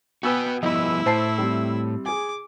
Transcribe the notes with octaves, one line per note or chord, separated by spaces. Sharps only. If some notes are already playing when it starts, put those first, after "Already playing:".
B3 F#4 B4 G5 G#5 E6
F3 G3 B3 E4 D#5 B5 E6
A2 C5 A5 C7
G3 C4
G#4 G#5 D6